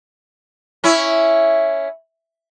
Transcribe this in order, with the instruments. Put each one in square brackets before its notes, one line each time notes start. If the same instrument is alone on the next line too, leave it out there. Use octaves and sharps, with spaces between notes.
[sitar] C#4 E4